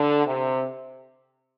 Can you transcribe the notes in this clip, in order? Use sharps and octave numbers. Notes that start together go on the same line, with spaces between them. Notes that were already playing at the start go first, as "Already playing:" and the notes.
Already playing: D3
C3